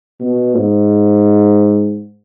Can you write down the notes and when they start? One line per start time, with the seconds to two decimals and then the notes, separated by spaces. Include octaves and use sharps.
0.20 B2
0.55 G#2